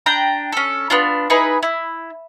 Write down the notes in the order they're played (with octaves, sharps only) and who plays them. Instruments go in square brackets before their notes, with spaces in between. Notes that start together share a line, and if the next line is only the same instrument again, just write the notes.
[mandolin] D4 G5 A#5
C#4 A4
B3 D4 F4
D#4 E4 G#4 B4
E4